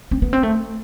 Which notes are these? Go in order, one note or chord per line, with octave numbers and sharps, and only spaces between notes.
C4
B3
C4
A3